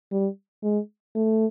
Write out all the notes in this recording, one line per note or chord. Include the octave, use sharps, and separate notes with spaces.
G3
G#3
A3